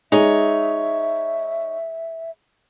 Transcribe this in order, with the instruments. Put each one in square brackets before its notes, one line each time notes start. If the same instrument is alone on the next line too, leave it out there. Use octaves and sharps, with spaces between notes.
[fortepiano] G#3 [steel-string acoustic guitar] D#4 C#5 [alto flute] E5